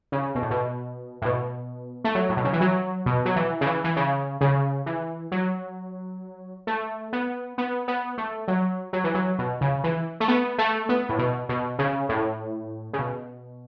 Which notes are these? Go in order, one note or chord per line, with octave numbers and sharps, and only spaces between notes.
C#3
B2
A2
B2
A2
B2
A3
F#3
A2
B2
C#3
E3
F#3
B2
F#3
E3
C#3
E3
E3
C#3
C#3
E3
F#3
A3
B3
B3
B3
A3
F#3
F#3
E3
F#3
B2
C#3
E3
A3
B3
A3
B3
A2
B2
B2
C#3
A2
C#3
B2